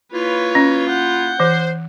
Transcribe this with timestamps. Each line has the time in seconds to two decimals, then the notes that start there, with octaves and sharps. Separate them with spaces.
0.14 A#3 E4 F4 B4 C#5
0.55 C#4
0.90 F#5 G6
1.40 E3 C5